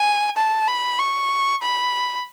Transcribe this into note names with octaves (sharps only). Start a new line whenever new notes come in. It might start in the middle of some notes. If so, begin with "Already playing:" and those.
Already playing: G#5
A5
B5
C#6
B5